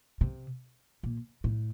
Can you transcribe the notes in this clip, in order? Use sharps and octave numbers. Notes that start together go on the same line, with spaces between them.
C3
A#2
A2